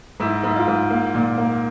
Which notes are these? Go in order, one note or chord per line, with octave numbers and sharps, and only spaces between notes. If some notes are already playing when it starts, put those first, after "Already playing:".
G#2 E4
G#2 E4
F4
G#2
A#3
A#2
A#3